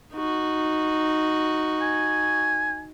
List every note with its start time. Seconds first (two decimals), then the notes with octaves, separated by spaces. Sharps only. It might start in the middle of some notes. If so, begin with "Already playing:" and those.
0.14 D#4 F#4
1.82 G#5